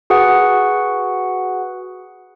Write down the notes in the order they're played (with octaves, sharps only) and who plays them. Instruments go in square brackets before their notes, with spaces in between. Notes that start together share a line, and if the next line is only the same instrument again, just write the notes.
[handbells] F#4 G#4 B4 F#5